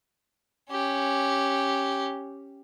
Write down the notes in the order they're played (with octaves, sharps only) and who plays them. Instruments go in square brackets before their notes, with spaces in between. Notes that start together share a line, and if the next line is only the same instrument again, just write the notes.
[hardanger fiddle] C#4 G4